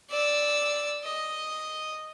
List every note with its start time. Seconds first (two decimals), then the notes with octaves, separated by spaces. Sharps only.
0.10 D5 E6
1.04 D#5